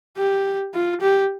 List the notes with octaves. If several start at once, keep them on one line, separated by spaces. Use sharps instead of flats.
G4
F4
G4